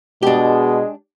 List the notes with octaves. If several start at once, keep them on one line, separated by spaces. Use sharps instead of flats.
B2 G#3 D4 G4